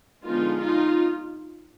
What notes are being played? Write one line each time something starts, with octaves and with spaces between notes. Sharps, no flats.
D3 F3 G#3 B3 D#4 F4
D#4 F4